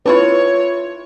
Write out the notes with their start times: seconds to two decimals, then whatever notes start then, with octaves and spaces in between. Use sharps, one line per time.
0.06 D4 E4 F4 B4 C#5